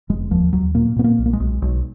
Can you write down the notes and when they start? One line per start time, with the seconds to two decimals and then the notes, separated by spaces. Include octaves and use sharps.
0.09 F1 G#3
0.31 D#2 F3
0.53 D#2 F#3
0.75 A#2 A#3
0.96 A#2 B3
1.04 A#3
1.19 B1
1.26 A#3
1.33 G#3
1.40 B1
1.62 B1